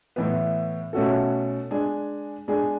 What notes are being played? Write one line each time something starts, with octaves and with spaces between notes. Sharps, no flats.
A2 E3 B3
B2 A3 C#4 F#4 A4
G#3 D4 G#4
G#3 D4 G#4